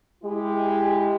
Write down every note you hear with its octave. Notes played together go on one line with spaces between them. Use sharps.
G#3 E4 G4